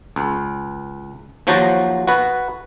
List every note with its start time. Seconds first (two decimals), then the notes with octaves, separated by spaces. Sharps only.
0.16 C#2
1.47 D#2 F3 F#3 F#4 C5 A5
2.07 F#4 B4